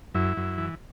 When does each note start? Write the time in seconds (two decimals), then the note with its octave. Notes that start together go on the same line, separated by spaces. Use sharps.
0.14 F#2 E4
0.37 F#2
0.58 E3